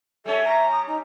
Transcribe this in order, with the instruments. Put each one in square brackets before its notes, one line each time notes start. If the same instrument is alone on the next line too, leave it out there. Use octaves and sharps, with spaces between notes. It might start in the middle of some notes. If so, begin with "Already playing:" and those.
[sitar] G3 C#4 [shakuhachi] A4 [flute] E5
[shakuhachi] A#5
[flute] D#6
D#4